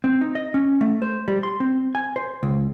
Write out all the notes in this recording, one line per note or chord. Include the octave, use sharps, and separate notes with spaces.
C4
D#4
D#5
C#4
A3
C5
G3
C6
C4
G#5
C5
C#2